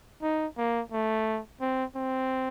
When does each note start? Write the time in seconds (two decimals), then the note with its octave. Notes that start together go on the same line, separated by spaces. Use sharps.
0.22 D#4
0.58 A#3
0.92 A3
1.61 C4
1.96 C4